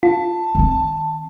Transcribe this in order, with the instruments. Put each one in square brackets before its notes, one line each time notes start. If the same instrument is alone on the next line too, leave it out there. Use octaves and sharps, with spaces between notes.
[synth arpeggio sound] F4 [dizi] A5
[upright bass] D#3 C4